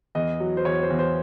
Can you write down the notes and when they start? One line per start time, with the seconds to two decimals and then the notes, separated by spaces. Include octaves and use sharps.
0.15 E2 D#5
0.40 F#3
0.57 C5
0.65 E2 C#5
0.83 C5
0.90 E2
0.99 C5